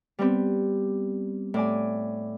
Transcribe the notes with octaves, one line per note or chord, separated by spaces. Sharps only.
G3 B3 C4
A2 D5 G#5